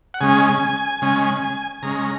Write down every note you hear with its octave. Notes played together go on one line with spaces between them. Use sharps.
F#5
C#3 G#3 C#4 G#5
C#3 G#3 C#4
C#3 G#3 C#4 A#5